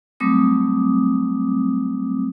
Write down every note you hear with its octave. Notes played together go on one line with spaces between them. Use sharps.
F#3 G3 A3 C4 D6 D#6